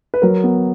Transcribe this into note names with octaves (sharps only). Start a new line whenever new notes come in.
B4
F#3 A#4
B3